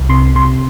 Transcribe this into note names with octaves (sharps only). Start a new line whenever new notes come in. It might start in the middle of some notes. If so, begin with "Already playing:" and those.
Already playing: C2
C3 C6
C3 C6